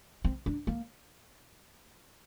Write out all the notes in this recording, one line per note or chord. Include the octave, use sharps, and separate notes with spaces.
C4
D4
A#3